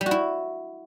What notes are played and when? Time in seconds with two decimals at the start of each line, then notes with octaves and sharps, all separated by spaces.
0.01 G3
0.06 F#4
0.11 E4